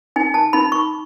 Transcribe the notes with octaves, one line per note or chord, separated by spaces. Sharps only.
D#4 G#5
A5
D#4 B5
C#6